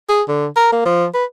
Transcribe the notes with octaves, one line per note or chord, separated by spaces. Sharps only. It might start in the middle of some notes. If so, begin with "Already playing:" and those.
G#4
D3
A#4
A#3
F3
B4